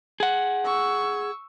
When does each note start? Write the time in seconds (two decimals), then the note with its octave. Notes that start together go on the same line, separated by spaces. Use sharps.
0.20 G#4 F#5
0.65 C#6 E6